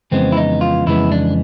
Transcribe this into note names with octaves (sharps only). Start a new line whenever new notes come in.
F2 C#3 E3 G#3 B3 C4
E4
D#4
F4
F2 C#3 E3 G#3 B3 E4
D4